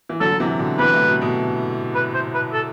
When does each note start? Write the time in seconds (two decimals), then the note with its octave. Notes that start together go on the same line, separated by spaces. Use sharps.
0.09 E3
0.21 D3 F#3 A4
0.32 F#3
0.40 C3 E3
0.59 B2 D3
0.79 C3 E3 B4
0.93 A2 C3
1.08 B2
1.22 B2
1.95 B4
2.15 C5
2.34 B4
2.53 A4